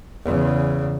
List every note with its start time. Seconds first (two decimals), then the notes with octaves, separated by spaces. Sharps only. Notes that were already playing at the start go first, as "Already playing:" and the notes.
0.24 E2 C#3